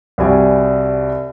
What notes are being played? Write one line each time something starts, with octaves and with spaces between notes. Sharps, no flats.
C2 G3 F#4 D5 G#5